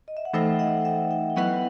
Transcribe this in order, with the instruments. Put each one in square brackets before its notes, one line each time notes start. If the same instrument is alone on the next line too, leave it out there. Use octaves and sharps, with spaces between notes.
[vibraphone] D#5
E5
F#5
[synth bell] E3 A3 D#4 A4 C5 [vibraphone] E5 G5
[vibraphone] D#5 F#5
E5 G5
E5 G5
G5
[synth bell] F#3 B3 E4 B4 [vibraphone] D#5 F#5